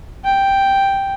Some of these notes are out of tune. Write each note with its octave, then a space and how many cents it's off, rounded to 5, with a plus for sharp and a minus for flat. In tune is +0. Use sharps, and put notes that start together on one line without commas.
G5 +0